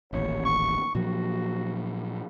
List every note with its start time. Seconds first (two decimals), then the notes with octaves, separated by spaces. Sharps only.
0.13 D#1 A1 D#2 C#5
0.45 C#6
0.95 A#2 F3 F#3 F#4